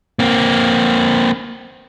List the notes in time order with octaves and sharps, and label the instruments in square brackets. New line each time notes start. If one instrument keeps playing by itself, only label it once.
[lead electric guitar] A#3 C4